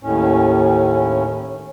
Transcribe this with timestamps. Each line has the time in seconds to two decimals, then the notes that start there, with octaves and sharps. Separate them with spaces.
0.03 D#2 A2 C#4